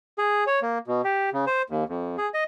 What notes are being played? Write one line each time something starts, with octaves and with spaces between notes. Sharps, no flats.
G#4
C#5
A#3
B2
G4
C#3
C5
D#2
F2
G#4
D#5